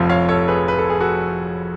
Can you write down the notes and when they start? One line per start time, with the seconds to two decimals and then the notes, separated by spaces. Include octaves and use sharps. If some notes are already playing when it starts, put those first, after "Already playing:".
Already playing: F1 F2 F3
0.09 C#5 F5
0.29 A4 C#5
0.48 G#4 B4
0.68 B4
0.78 A4
0.89 G#4
1.00 F#4 A4